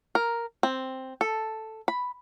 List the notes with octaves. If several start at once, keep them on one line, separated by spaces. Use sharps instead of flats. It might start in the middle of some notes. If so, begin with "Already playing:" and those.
A#4
C4
A4
B5